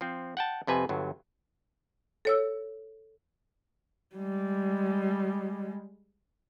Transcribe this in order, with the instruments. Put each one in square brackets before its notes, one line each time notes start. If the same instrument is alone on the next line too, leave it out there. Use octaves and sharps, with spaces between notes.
[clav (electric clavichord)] F3 C4
F#5 G5 A5
F2 C3 B4 G#5
G1 G2 F#3
[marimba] A4 C#5 E6
[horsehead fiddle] G3 G#3